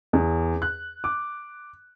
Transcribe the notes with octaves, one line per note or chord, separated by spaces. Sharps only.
E2
F#6
D6